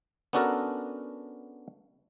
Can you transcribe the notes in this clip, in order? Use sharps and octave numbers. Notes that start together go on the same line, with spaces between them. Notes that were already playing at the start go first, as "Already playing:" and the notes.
B3 C#4 D4 F#4 A4 A#4